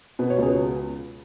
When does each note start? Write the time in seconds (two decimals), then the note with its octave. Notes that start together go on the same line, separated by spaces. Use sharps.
0.19 B2 B4
0.30 C#5
0.38 C#2 G#4 B4